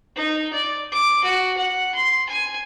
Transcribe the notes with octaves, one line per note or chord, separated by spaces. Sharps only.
D#4
D5
D6
F#4
F#5
C6
G#5